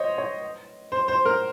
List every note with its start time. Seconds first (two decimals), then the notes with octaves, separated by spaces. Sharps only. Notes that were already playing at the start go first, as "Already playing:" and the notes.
Already playing: C5 C#5 D#5
0.18 C#5
0.92 C5
1.08 C5
1.25 A#4